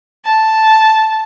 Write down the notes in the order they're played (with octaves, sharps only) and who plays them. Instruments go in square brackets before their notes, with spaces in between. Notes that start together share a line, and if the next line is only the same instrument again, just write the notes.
[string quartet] A5